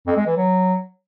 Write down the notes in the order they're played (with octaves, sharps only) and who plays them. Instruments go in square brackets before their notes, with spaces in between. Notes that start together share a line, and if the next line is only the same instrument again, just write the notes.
[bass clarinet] F2
G#3
E3
F#3